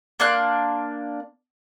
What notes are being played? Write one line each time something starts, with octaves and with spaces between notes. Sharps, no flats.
A#3 D4 C6 F#6